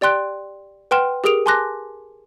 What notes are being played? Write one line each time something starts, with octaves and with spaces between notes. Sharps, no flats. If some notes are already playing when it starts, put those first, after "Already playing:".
G4 D5 G5 C6 F#6 D7
B4 F#5 G5 C6 F6 E7
G4 G#4 A#4 D#6 D7 F7
G#5 A5 C6 D6 F#6 A#6